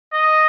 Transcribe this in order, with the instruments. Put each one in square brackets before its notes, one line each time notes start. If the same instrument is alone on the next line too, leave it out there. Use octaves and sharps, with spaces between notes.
[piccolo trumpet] D#5